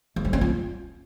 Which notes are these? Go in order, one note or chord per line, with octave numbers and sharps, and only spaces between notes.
A3
G3
C#4
F4